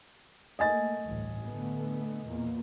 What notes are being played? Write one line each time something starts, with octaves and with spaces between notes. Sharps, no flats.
A3 A#3 D#5 G#5 A6
A1 D2 G2
D3 A3 B3
E2 A#2 A#3